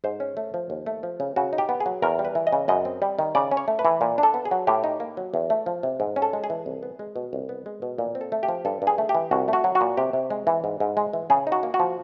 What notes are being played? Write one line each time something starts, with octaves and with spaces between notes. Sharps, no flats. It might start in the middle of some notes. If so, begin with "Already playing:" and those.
G#2 C5
C#4
A3
F3
D#2
A3
F3
C#3
C#3 F#4
D#4
G4
B3
G#4
F#3
E2 A#4
G3
B4
E3
D#5
C#3
F#2 D#5
C4
G3
D#3
C#3 D5
C#4
C#5
A3
B4
E3
A#2
D4
A4
B3
G#4
F#3
A2 G4
D#4
A#3
F#3
E2
A3
F3
C3
G#2
C#4
A4
G#3
G#4
E3
C2
B3
G#3
B2
C2
B3
G#3
B2
A#2
C4
A4
A3
G4
F3
G2 A4
G2
G#4
A3
G4
E3
C2 F#4
A3 F#4
F#3
F#4
A#2
C3 G4
C3
G#3
E3
G#2
G#2
G#3
E3
C#3 G#4
D#4
F#4
A#3
F#4
F3